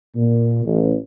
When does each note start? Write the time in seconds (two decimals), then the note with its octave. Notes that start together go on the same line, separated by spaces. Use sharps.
0.16 A#2
0.66 A1